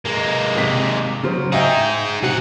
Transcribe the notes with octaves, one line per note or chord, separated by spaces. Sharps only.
G#3 A#3
G#1 C3 B6
C#3 F#3 C5
D#4 G#4 D#5 E5 G5
C3 C4 F#4 F#5